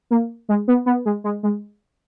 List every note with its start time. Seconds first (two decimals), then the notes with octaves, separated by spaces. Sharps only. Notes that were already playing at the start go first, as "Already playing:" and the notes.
0.11 A#3
0.49 G#3
0.68 B3
0.86 B3
1.06 G#3
1.24 G#3
1.43 G#3